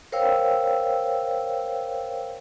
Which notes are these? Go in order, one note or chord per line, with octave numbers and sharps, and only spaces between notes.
A#4 C5 C#5 F5 G5 E6